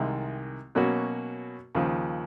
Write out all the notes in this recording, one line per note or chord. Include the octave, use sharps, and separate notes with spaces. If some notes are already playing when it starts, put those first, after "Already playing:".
Already playing: C2 C3 D#3 G#3
B2 F#3 A#3 C#4 F#4
D#2 C#3 F3